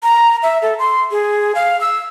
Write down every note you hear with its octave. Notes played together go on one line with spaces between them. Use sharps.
A#5
E5
A4
C6
G#4
F5
E6